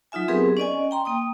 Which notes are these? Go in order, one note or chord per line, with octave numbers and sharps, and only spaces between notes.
F#3 D#4 F4 E5 G#5
B3 C4 G4 G#4 A#4 B4
C#4 D5 D#5 G#5
G5 A#5 C6
A#3 G5 D#6